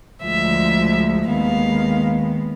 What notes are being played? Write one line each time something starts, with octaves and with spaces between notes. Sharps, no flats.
D2 D3 F3 G#3 E5
D#2 D#3 G#3 B3 F5